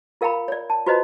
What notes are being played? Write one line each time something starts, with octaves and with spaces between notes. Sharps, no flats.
F4 A#4 F5 G5 A#5 B5
C#5 D5
A5
F4 F#4 B4 C5 D#5 A#5